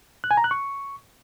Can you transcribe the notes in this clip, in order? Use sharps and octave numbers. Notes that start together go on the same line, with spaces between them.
F#6
G#5
A#5
F#6
C#6